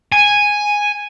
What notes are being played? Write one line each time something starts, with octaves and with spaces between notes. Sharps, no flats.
G#5